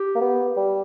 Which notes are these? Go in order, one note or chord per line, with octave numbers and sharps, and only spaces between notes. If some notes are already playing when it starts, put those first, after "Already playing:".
Already playing: G4
A#3
B3
G3